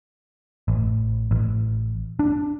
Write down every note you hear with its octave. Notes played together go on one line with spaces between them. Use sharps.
A1
A1
D4